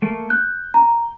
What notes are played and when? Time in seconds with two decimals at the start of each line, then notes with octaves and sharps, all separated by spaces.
0.02 A3 A#3
0.30 F#6 G6
0.74 A#5